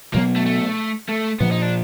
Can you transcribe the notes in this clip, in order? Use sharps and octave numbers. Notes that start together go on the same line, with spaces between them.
B2 F#3 A#3 B3
A3
A3
A3
A#2 F3 A#3 B3
D#4
D4